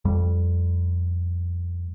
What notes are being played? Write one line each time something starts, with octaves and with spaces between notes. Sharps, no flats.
F2 G3